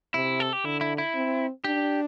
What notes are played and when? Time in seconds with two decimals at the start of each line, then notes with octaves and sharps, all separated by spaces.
0.14 C3 E4
0.40 A4
0.53 G4
0.65 D3 E4
0.81 E4
0.98 E4
1.15 C4
1.64 D4 G4